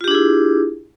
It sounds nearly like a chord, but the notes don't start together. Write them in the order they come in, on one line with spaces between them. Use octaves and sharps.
F4 G4 D4 G#4 E4